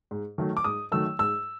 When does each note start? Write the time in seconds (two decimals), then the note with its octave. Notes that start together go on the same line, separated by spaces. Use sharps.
0.11 G#2
0.38 D#3 F#3 A3
0.57 D6
0.64 G#2 D#6
0.92 D#3 F#3 A3 E6
1.19 G#2 E6